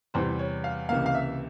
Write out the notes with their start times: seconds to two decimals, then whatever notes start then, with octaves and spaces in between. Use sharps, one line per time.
0.14 E2 C3 E3 G3 C5
0.39 C#5
0.64 F5
0.89 C#2 C3 E3 A#3 F5
1.06 F5
1.15 E5